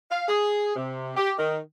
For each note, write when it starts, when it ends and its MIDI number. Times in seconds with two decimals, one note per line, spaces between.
0.11 0.25 77
0.29 0.75 68
0.76 1.15 48
1.17 1.33 67
1.39 1.59 51